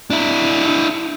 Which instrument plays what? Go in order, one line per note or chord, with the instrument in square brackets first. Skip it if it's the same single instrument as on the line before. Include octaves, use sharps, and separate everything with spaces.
[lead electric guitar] D4 E4